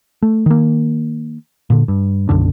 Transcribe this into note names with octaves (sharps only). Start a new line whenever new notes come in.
A3
D#3 A#3
A#2 D3
G2
B1 F#2 D3 D4